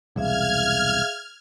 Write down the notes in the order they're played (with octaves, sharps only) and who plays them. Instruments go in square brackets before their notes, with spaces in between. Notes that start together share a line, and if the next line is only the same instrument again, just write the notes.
[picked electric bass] E1 C2 [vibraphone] G#4 E5 F5 [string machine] F6 G#6